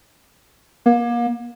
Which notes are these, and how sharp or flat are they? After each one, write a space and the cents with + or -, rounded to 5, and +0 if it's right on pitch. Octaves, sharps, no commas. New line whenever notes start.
A#3 +35